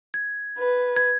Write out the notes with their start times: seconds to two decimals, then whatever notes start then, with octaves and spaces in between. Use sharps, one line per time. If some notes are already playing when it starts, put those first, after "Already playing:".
0.14 G#6
0.59 B4
0.96 G#6